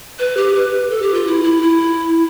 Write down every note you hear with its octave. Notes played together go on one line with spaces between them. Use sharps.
B4
G4
B4
A4
G4
F4
E4
E4
E4